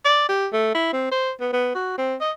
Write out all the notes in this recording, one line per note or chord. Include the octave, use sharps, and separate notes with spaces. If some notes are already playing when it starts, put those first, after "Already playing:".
D5
G4
A3
E4
C4
C5
B3
B3
F#4
C4
D#5